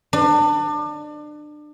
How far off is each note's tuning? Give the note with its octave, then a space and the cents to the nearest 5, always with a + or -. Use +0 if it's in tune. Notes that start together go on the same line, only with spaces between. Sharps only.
D4 +30